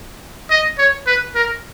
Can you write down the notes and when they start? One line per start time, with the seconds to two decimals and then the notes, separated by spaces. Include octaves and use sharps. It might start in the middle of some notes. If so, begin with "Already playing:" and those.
0.50 D#5
0.78 C#5
1.07 B4
1.35 A#4